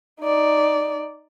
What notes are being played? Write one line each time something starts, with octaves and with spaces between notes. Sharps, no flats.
D#4 D5